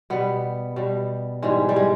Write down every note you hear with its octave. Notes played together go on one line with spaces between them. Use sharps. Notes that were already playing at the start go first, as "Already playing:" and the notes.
B2 G3 B3
B2 G3
G#2 E3 G3 G#3
G3
G#3